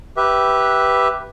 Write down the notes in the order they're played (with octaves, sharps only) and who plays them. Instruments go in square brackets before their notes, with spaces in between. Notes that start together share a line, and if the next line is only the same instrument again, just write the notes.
[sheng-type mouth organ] G4 B4 E5